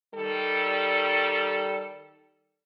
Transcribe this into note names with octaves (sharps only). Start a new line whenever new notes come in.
D#3 G3 A4